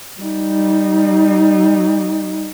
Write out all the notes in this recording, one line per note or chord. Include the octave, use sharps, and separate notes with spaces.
G3 D#4